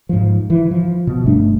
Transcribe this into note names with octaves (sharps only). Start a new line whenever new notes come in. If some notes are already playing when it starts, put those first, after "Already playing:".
G#2 F3
E3
F3
B2
G1 G2 A3 D4